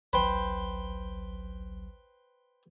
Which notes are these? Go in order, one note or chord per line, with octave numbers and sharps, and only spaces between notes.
A1 D2 F#3 B4 C5 G5